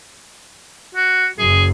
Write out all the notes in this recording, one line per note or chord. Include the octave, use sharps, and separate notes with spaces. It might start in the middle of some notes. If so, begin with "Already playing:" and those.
F#4
F#1 F#2 G#4